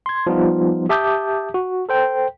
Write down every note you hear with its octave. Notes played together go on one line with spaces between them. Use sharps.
C6 G#6
F3 G3 B3 D#4 F4
G4 E5 A5 D6 D#6 G6
F#4
A4 C5 G5